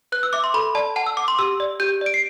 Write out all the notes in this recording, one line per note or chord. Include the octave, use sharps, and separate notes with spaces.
B4 F#6
E6
E5 D6
C6
A4 B5
D5 A5
F#5 A5
E6
F#5 D6
C6
G4 E6
D5
G4 G6
D5 D7
C7